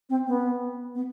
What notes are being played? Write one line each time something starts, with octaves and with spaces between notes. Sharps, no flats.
C4
B3
B3